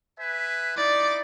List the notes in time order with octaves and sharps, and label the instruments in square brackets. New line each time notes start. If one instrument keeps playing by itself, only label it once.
[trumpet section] B4 E5 G#5
[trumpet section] D#4 E4 D6 [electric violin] D5